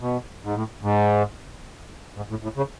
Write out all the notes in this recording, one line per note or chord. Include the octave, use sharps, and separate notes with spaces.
B2
G#2
A2
G#2
G#2
A2
A2
C#3